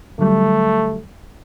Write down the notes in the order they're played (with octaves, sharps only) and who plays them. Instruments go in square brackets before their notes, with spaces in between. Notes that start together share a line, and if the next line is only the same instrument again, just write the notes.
[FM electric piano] D3 F#3 G3 [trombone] A3